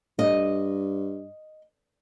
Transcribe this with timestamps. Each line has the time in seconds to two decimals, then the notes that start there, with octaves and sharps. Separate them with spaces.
0.19 G2 D#5